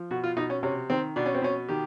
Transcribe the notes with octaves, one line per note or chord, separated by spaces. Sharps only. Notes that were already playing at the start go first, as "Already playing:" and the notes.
Already playing: F3
B2 F#4
F4
B2 D#4
C#4
C3 C#4
D#3 C4
B2 D4
C#4
C4
B2 C#4
D#3 G4